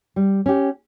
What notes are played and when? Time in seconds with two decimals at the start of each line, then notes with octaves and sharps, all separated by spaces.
0.16 G3
0.46 C#4 G4